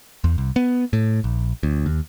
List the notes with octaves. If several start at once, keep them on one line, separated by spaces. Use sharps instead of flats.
E2
C2
B3
A2
A#1
D2
D#2